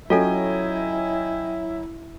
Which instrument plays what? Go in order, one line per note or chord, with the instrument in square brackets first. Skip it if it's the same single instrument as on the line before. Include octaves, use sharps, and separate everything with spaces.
[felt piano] F#3 C#4 [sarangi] E4 [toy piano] F4 A4 [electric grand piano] D#5 G5 G#5